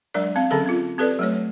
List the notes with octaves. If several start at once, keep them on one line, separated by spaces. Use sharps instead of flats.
F#3 G#3 D4 A#4 D5
C4 F5
D3 F#3 C#4 G#4 A4 A5
C4 F4
C4 G4 A4 B4 D5
F#3 A3 C#5